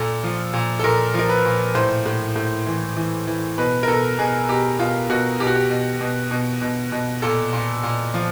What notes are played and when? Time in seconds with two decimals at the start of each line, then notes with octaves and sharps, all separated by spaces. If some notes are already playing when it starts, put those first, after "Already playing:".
Already playing: A#2 A4
0.23 F3
0.53 A#2
0.79 A4
0.84 A#2 A#4
1.14 F3 A#4
1.29 B4
1.45 A#2
1.75 A2 C5
2.06 A2
2.36 A2
2.67 E3
2.97 E3
3.27 E3
3.58 B2 B4
3.83 A#4
3.88 B2 A4
4.19 B2 G#4
4.49 B2 G4
4.79 B2 F4
5.09 B2 F#4
5.40 B2 G4
5.47 F#4
5.55 G4
5.70 B2
6.01 B2
6.31 B2
6.61 B2
6.92 B2
7.22 A#2 A4
7.53 A#2
7.83 A#2
8.14 F3